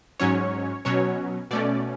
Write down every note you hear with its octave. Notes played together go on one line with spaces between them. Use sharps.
G#2 F#3 C#4 C#5
B2 F#3 C#4 C#5
B2 A3 C#4 D5